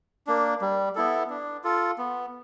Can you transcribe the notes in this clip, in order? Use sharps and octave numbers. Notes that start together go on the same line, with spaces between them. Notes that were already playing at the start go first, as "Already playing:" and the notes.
A#3 D4
G3
B3 E4 A4
D4
F4 A4
B3